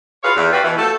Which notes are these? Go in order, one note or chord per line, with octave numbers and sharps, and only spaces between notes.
F4 F#4 G#4 B4 C#5 F5
E2
F#4 G4 B4 D5 F5
B2 E3
F3 A3 F#4 A4